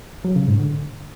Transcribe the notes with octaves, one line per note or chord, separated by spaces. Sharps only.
F#3
C#3
G#2
D3